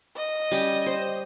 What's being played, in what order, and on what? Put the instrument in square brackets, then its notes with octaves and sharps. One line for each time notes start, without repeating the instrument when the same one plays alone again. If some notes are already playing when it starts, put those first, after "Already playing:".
[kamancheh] D#5
[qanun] G3 C#4 G4
C5